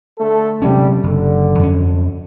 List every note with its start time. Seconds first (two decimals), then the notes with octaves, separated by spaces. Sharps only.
0.19 D3 A3 A4
0.62 G#2 C3 F#3 G3 C#4
1.03 F#1 D3
1.59 F2 C#4